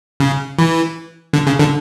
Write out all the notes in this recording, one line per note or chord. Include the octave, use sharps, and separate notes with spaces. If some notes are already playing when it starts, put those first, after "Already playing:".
C#3
E3
D3
C#3
D3